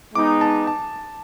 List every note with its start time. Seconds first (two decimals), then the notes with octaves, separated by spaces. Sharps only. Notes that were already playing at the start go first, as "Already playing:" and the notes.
0.14 G#3 B3 D#4 D6
0.41 A5
0.67 A5